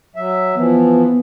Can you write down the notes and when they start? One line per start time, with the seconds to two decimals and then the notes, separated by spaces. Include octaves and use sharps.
0.16 F#3 E5
0.55 E3 F3 B3